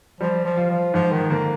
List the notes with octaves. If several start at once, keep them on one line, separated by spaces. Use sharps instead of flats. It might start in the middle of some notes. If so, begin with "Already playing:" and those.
F3 G3
F3
F4
F3
G#2 F3
D#3
D3 A#3